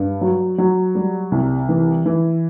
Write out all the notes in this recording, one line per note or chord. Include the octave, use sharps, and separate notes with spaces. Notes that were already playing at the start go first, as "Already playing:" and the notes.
Already playing: G2
F#3
F#3
G3
C2
E3
E3